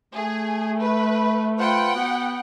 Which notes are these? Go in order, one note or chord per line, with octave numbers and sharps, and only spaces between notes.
A3 G#4
B4
F4 B4 C5 F#5 G5
B3 F#4